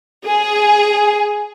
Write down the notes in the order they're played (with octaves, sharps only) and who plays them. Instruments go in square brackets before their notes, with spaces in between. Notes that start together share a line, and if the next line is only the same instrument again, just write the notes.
[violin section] G#4